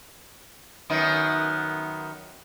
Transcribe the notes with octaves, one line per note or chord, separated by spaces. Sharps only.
F#2 D#3 B3